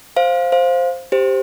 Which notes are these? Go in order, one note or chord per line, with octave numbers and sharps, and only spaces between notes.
C5 F5
C5 F5
G4 C5